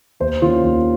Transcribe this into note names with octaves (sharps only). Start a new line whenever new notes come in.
D#2 C5
D#3 A#3 C#4 F4
D#2